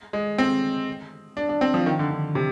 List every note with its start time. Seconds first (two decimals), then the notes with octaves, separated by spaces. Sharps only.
0.13 G#3
0.38 C4
1.37 D4
1.49 D4
1.61 C4
1.74 F3
1.86 D#3
1.99 D3
2.11 D3
2.35 C3